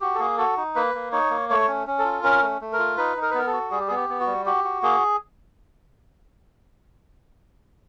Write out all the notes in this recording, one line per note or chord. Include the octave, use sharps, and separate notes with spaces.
F#4 G4
A4
A#3 G#4
F#4 A4
D#4
A#3 B4
A#3
D#4 C#5
A#3
A3 C#5
C#4
C#4
A4
F4
C#4 A#4
A3
A3
A#4
F4
D#4 B4
D#4
A#4
B4
B3 A#4
A4
F#4
G3 G#4
G4
G#4
B3
G4
B3
F#4
G3
F#4 G4
F#4
A#3 G#4